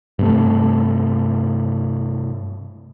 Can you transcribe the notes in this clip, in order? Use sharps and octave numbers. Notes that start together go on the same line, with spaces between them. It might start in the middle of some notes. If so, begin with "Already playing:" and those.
G2 C3 A3